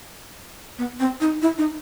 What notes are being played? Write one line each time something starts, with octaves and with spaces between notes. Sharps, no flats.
B3
C4
D#4
E4
D#4